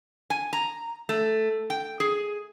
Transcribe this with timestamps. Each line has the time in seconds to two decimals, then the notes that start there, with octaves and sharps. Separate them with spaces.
0.30 G#5
0.53 A#5
1.09 A3
1.70 G5
2.00 G#4